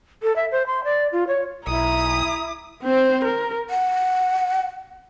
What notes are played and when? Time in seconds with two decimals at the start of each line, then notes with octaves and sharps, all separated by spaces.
0.23 A4
0.36 E5
0.51 C5
0.67 C6
0.84 D5
1.12 F4
1.27 C#5
1.67 B1 E4 A#5 D#6
2.83 C4 C5
3.24 A#4
3.70 F#5